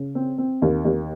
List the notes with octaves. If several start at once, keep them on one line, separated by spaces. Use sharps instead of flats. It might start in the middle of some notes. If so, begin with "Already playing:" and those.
Already playing: C#3
C4
C4
D#2
D#2